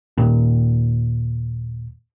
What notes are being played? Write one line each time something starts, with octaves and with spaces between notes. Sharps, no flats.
D#2 A#2